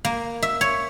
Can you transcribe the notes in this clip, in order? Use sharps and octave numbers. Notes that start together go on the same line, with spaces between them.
A#3
E5
C#5